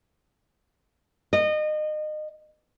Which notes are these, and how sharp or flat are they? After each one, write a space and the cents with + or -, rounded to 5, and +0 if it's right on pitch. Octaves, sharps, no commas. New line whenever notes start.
D#5 -30